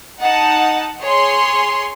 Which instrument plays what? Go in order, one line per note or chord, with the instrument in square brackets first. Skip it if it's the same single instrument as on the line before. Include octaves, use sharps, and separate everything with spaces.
[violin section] D#4 F#5 A5
G#4 C#5 C6